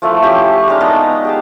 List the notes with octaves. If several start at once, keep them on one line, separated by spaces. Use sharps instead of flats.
F3 A3 E4 B4
C#4 G4 D6
G#3 D4 D#4 F5
B3 D#5
G4 G#4 A5